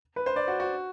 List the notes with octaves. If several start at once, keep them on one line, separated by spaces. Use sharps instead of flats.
B4
C5
D5
F#4
F#4